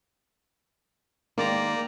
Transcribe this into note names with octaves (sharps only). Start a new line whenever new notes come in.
D#3 G#3 A#3 D5 A#5